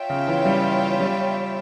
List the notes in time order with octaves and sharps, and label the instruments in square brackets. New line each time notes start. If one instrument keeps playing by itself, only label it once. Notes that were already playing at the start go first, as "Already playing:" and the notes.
Already playing: [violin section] F4 C#5 E5 G5
[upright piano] C#3
E3
G3
G3